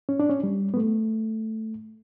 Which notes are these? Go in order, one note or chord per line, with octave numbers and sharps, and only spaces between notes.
C#4
D4
C#4
G3
B3
A3